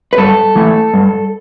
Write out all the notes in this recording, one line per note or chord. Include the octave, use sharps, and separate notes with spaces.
B4
G2 A4
E3 A3
G2